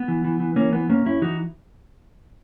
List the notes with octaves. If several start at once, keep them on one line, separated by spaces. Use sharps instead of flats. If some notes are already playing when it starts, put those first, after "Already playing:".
Already playing: B3
E3
E3
E3
E3 A#3 C#4
E3 B3
F#2 A#3 C#4
F#2 C#4 E4
E3 D#4 F#4